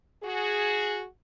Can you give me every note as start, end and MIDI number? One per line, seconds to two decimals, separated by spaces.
0.23 1.05 66
0.23 1.05 68